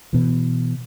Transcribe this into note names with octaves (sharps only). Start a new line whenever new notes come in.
B2 E3